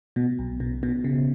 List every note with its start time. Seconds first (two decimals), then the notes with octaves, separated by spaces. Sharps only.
0.16 B2
0.39 B1
0.60 B2
0.83 B2
1.04 C#3